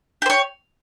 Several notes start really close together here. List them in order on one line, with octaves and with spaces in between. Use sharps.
G4 C5 C#5